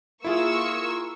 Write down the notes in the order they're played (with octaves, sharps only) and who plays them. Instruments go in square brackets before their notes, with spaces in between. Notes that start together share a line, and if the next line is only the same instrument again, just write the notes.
[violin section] A#3 C#6 E6 [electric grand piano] E4 F4 G#4